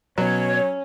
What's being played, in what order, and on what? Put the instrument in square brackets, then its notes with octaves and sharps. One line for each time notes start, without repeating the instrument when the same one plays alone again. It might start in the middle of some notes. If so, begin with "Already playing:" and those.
[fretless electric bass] B2 [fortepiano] F#3 [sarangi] C#4 [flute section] C#5